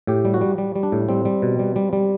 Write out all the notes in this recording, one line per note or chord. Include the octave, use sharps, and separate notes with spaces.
A2 G4
G3
F#4
G3
G3
G3
D4
A2
G3 C4
G3
B2
G3
G3
G3